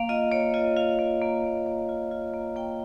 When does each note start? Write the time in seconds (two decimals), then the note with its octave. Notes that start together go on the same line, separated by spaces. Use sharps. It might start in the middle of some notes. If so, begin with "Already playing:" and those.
Already playing: A#3 F5
0.09 F4 D#5
0.32 A#3 C#5
0.54 F4 D#5
0.77 F4 F5
0.99 A#3
1.22 A#3
1.44 A#3
1.66 A#3
1.89 F4
2.11 F4
2.34 A#3
2.56 A#3 G5